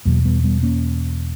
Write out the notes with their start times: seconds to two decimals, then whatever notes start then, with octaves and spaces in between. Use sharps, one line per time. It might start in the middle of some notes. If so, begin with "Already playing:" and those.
0.05 E2 B2 F#3 A#3
0.25 G3 B3
0.44 G3 B3
0.63 A#3 C#4